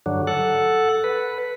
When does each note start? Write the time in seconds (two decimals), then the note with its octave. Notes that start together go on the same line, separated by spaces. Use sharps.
0.06 G2 D3 F#3
0.27 A4 F#5
1.04 B4